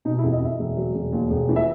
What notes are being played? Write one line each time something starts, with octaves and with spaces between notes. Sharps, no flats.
B2 D#4
E4
E2
D#5
E2 E5
E1
F#3
E1
D#2
E1
E3
E5